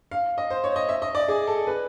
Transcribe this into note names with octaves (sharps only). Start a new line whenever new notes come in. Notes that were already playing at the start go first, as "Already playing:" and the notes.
F5
D#5
C5
C#5
D#5
E5
D#5
D5
G#4
A4
B4